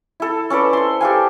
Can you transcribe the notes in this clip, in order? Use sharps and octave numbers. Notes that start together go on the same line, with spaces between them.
E4 A4
C#4 A4 B4 D5
C5 C6
G4 A4 F5 G#5